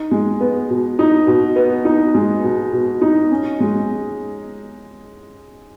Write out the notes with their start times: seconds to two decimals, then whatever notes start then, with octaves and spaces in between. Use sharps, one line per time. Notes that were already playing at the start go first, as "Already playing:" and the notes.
Already playing: D#4
0.11 G#3
0.41 B3
0.70 B2
0.99 D#4
1.27 B2
1.56 B3
1.85 D#4
2.14 G#3
2.44 B2
2.72 B2
3.01 D#4
3.31 C#4
3.60 G#3